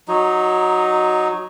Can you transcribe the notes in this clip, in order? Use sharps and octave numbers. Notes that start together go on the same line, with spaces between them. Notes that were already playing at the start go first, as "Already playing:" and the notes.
F#3 D#4